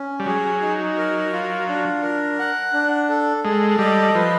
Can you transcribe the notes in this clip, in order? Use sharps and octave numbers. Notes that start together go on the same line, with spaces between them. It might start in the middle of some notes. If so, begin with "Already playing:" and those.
Already playing: C#4
G3
F#3 G#4
D#4
A#4
F4
D4
A#4
F#5
D4
A4
G#3 A4
G3 D#5
F3 B4